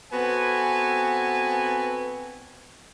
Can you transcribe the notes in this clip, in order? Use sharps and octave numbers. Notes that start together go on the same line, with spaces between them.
B3 C4 F#4 A4 G#5